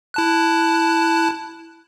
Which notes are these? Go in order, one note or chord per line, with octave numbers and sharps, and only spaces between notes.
E4 A5 F#6